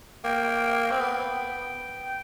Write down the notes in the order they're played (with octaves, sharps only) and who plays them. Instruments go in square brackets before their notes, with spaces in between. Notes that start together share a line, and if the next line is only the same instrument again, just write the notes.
[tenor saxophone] A#3 [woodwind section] G5
[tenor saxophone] C4
B3